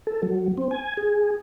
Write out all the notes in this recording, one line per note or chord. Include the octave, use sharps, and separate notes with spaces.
A4
F#3
C4
G#5
G#4